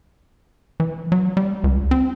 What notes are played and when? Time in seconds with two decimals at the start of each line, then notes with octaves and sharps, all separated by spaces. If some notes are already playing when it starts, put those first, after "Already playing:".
0.80 E3
1.12 F#3
1.37 G3
1.64 C#2
1.91 C4